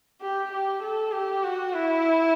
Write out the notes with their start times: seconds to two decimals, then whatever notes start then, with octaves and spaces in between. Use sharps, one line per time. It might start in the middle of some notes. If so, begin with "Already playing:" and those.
0.22 G4
0.52 G4
0.83 A4
1.12 G4
1.44 F#4
1.74 E4